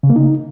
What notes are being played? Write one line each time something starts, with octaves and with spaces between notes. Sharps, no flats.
C#3
A#3
D#4